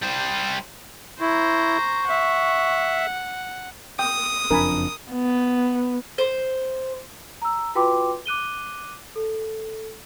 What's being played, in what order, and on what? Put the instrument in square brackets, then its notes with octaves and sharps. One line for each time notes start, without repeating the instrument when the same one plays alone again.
[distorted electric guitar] G3 C5
[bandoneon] E4 [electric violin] C5 A#5 [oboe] C#6
[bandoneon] E5 [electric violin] F#5
[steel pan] G5 [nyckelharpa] D#6
[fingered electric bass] F#1 F2 D4 [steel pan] A#4 G#5 B5
[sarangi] B3
[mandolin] C5
[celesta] A#5 E6
F4 F#4 B4 G5 C6 D6
D6 F#6 D#7 G7
A4